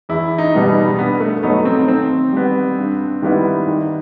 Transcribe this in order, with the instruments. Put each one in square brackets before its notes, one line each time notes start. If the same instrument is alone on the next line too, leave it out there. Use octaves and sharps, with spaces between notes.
[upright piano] E2 [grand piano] E4
[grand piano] D#4
[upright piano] B2 G3 B3
[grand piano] D#4
[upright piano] G2 [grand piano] B3
[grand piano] A3
[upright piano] F#3 A3 D#4 A4 [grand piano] B3
[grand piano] C4
[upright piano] D#3 [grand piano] C4
[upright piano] G3 B3
G2
D#3 G3 B3 E4
D#3